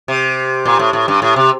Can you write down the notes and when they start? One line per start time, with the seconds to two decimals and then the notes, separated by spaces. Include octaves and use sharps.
0.08 C3
0.65 A#2
0.79 A2
0.93 A2
1.08 G2
1.22 A2
1.36 C3